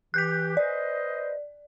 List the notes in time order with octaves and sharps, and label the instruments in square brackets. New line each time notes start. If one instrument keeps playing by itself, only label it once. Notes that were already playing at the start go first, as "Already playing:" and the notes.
[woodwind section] E3 G4 [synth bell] F#6 G6 B6
[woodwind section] B4 C5 D#5 [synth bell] D5